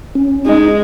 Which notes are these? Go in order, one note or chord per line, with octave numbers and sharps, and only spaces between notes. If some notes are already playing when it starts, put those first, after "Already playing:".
C#4
G#3 D#4